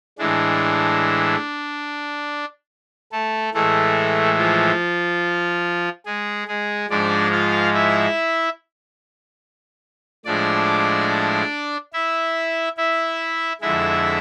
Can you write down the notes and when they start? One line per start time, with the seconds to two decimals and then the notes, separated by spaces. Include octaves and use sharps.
0.18 A2 E3 G#3 D4
3.12 A3 A4
3.54 A2 E3 G#3 A3 A4
4.38 F3 F4
6.06 G#3 G#4
6.48 G#3 G#4
6.90 G#2 F3 G#3 D4 D5
7.32 F4 F5
7.73 E4 E5
10.25 A2 F3 G#3 D4 D5
11.93 E4 E5
12.77 E4 E5
13.61 F2 D3 G#3 E4 E5